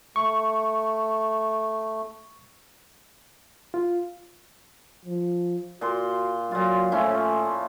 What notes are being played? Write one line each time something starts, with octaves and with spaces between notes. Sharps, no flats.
A3 C#6
F4
F3
A#2 F#4 C6
A#2 F#3 F4
A2 F3 C#4 E4